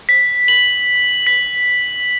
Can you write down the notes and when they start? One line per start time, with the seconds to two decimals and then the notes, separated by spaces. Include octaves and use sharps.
0.09 B6
0.48 F#7
1.27 B6